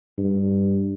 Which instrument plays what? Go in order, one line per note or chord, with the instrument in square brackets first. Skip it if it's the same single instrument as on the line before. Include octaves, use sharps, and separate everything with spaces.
[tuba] G2